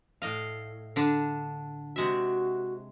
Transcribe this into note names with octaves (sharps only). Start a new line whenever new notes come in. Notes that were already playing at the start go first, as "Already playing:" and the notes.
A2 D#5 F5
D3 D4
C3 G#3 F#4 E5